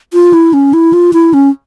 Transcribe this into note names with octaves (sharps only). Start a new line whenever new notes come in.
F4
E4
C#4
E4
F4
E4
C#4